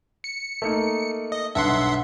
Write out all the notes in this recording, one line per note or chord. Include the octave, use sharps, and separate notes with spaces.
C#7
A3 A#3 D#4
D#5
B1 G2 D3 E5 F#5 C6